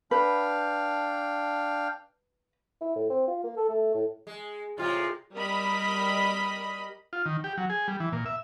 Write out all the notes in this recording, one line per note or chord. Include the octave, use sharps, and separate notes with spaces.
D4 B4 F5 G5
E4
A2
C4
F4
A#3
A4
A3
A2
G#3
A2 C3 G#3 F4
G3 A#4 D#5 B5
F4
D#3
G4
F#3
G#4
G3
E3
A#2
E5